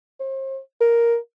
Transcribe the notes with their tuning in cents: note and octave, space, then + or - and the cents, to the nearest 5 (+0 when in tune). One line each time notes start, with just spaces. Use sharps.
C5 +40
A#4 +5